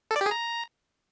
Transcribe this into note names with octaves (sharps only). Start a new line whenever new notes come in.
A4
D5
G4
G#4
A#5